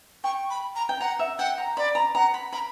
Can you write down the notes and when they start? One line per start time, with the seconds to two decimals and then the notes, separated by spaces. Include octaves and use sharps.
0.24 G5 C#6
0.50 B5
0.75 A#5
0.89 G5
1.01 F#5 A#5
1.19 E5
1.39 F#5 G5
1.58 A#5
1.77 D5 B5
1.95 A#5
2.15 F#5 A#5
2.34 B5
2.53 A#5 B5